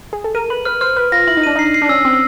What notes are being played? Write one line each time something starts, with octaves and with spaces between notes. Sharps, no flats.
G#4
A4
A#4 D#7
B4 F#7
B4 F6
C5 F6
B4 F6
F4 A#6
E4 F#7
D#4
D4 D#7
D#4 C7
C7
D4
C#4 E6
C4 E6